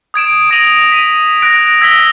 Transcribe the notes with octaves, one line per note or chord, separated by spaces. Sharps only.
D#6 G#6 D7 E7
D#6 A#6 D7 D#7 F7 F#7
B6 D#7
F#6 A#6 D7
E6 G#6 A#6 B6 F#7 G7